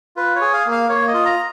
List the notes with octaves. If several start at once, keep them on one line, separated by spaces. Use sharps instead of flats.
F4 B4
C#5
G#4
F5
A#3
F5
A#3 C#5
D#5
F4
A#5